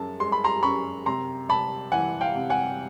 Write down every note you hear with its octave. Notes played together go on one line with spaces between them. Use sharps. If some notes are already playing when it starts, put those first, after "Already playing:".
Already playing: F#2 G#3 A5
G#3 C6
B5
A#5 C6
F#2 B5 C#6
C3 A#5 C6
C3 A5 B5
E3 F#5 G#5
F5 G5
C3
F#5 G#5